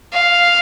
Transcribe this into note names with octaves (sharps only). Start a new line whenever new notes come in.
F5